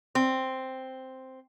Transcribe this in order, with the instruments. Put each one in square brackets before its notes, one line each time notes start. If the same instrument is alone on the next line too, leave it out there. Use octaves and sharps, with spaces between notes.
[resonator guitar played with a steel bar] C4